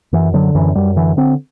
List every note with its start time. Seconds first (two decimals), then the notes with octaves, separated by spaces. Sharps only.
0.13 F#2 E3
0.34 D3 F#3
0.55 F#2 E3
0.75 F#2 G3
0.96 D3 E3
1.17 D3 C4